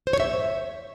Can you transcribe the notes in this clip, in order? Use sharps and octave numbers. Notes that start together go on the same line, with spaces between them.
C5
C#5
E5